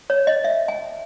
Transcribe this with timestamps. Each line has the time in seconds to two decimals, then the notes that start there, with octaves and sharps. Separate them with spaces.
0.10 C#5
0.27 D#5
0.44 E5
0.68 G#5